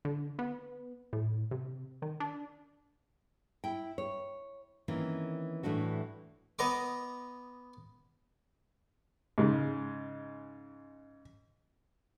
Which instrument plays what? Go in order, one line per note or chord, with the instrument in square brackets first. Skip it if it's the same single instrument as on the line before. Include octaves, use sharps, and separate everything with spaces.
[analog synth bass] D3
B3
A2
C3
D#3
D4
[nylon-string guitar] E4 G5
C#5
D#3 E3 A#3 C4 C#4
A2 E3 A3 D4 F#4
[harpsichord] B3 D#5 A#5 D6
[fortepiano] G#2 C#3